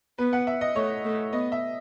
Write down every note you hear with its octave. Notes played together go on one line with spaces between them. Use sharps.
B3 B4
F#5
E5
D#5
A3 C#5
A3
B3 D#5
E5